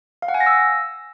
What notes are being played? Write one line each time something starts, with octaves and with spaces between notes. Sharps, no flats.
F5
F#5
G#5
A#6
E6